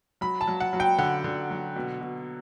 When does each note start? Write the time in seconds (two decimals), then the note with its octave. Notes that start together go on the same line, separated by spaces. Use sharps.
0.21 F#3 B5
0.41 A5
0.47 F#3
0.60 F#5
0.73 F#3
0.80 G5
0.98 D3 F#5
1.24 D3
1.50 F#3
1.76 B2
2.01 B2